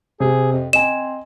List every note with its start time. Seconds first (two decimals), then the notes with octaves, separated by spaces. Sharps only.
0.20 C3 G#4
0.52 F2
0.73 C4 D#5 G#5 E7